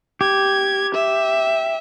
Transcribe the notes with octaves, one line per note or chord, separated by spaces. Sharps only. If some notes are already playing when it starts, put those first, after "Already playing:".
G4 G#6
E5